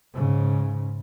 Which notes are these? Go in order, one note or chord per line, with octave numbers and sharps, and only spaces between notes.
G#2 C#3